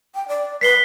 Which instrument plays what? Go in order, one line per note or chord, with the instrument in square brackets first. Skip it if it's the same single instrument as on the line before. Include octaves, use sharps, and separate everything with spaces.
[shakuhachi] G5
D5
[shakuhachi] B4 [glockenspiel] B6 C7 G7